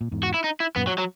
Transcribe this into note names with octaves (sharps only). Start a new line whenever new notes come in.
A#2
E2 G#2
F#4
E4
D#4
E4
F#2 A#2 B3
F#3
F#3